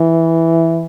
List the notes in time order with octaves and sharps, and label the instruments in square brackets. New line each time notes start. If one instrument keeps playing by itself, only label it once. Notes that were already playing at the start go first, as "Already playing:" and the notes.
Already playing: [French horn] E3